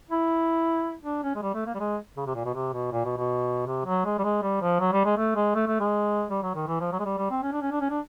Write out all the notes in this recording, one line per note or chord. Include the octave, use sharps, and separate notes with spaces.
E4
D4
C#4
G#3
G3
A3
A#3
G3
G#3
C#3
C3
A#2
B2
C3
B2
A#2
B2
B2
C3
F#3
G#3
G3
G#3
G3
F3
F#3
G3
G#3
A3
G#3
A3
A3
G#3
G3
F#3
D#3
E3
F3
F#3
G#3
G3
G3
C4
C#4
D4
C#4
D4
C#4
D4